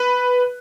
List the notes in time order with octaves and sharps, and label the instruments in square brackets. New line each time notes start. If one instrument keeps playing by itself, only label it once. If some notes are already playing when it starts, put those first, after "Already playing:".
Already playing: [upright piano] B4